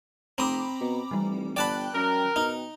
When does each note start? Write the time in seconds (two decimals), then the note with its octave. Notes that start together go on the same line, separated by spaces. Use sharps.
0.38 F1 C4 A#5 B5 D6 D#6
0.80 B2
1.11 F1 E3 G3
1.56 G1 D5 G5 A5 B5 F#6
1.95 F#2 A#4
2.36 B2 D#4